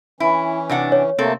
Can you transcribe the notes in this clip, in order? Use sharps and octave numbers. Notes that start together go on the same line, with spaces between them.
E3 C#4 E4
C3 D4 F#5
C#5
C3 A3 A#3 C4 A4